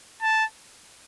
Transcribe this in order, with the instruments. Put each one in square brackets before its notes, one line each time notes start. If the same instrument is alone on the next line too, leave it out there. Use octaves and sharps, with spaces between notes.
[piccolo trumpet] A5